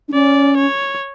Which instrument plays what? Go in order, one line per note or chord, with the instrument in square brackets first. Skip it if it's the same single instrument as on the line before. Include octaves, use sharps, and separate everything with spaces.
[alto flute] D4
[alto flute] C#4 [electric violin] D5
[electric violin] C#5